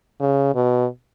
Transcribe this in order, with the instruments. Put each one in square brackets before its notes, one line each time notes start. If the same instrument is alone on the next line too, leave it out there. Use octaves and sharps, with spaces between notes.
[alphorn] C#3
B2